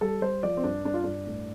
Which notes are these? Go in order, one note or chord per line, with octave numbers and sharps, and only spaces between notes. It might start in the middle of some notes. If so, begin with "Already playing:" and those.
G3 A4
G3 C5
F3 D5
C4
G2 D4
G2 D4
F4
G2 D4
A2